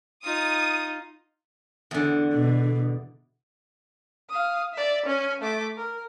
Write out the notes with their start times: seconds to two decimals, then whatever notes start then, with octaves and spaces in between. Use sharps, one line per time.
0.24 D#4 F4 D#6
1.91 E2 D3
2.33 B2
4.29 F5 D#6
4.73 D5 E5
5.05 C#4 G#5
5.41 A3 D6
5.77 A#4